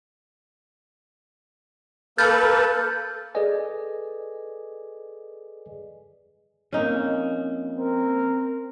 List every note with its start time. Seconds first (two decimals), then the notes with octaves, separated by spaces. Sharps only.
2.18 A#3 A4 B4 F6 G6 A6
3.35 G#4 A4 B4 D5 D#5 G#5
6.73 F2 A#3 C#4 D#4
7.77 C4 A#4